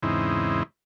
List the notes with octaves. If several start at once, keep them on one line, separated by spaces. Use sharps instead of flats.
E2 G#2 C#3 C4 D#4 E4